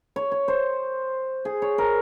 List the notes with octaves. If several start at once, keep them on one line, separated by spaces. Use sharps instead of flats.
C#5
C#5
C5
G#4
C#5
A#4